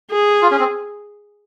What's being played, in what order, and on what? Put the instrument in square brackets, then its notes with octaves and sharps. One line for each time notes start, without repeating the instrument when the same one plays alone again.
[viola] G#4
[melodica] F4
C#4
C4